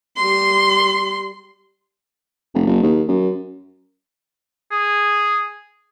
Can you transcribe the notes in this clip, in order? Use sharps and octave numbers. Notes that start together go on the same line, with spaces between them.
G3 C6
F1
F#1
D#2
F#2
G#4